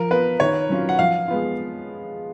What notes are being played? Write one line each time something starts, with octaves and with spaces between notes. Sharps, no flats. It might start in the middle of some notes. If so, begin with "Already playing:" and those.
Already playing: F3 A#4
B3 F4 B4
D#3 C#5
F#3 C#4 F4
F#5
F3 F5
G#3 B3 F4